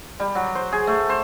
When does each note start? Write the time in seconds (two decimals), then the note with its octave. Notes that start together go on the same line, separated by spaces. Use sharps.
0.20 G3
0.35 F#3
0.55 C5
0.73 G#4
0.87 A3
1.09 C5